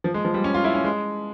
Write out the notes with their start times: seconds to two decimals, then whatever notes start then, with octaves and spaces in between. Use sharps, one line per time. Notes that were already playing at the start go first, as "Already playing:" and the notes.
0.04 F3
0.14 G#3
0.25 F3
0.34 G3
0.44 C#4
0.54 F4
0.64 E4
0.74 C#4
0.84 G#3